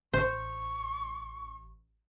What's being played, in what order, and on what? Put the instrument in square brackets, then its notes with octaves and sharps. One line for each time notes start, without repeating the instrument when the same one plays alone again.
[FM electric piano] A1 [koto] C5 [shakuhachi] C#6